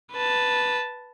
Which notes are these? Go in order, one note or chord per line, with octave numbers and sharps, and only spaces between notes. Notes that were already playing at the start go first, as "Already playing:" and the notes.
B4 A5